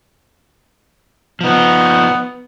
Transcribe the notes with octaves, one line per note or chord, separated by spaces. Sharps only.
F3 B3 D#4